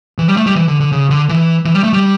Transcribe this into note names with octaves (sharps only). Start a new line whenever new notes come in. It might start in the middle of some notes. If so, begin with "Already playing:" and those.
E3
G3
A3
G3
E3
D3
D3
C#3
D3
E3
E3
G3
A3
G3